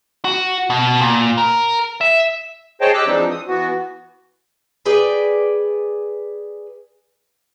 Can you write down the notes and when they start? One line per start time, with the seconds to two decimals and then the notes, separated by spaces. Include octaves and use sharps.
0.25 F#4
0.70 B2
1.01 A#2
1.38 A#4
2.01 E5
2.81 G#4 C5 C#5 D#5 G5 A5
2.94 G4 D#5 G5 D6 E6 F#6
3.07 E3 F3 G#3 C4 D4 D#4
3.30 D#6
3.47 E3 B3 F#4
4.86 G#4 B4 D5 G5